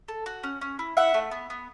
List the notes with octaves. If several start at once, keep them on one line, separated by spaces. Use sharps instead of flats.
A4
F#4
C#4
C#4
E4
E4 E5 F#5
A3
B3
B3